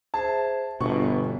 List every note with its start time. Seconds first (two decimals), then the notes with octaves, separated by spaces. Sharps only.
0.14 G#4 C5 E5 A5
0.81 G1 B2 D4 C#6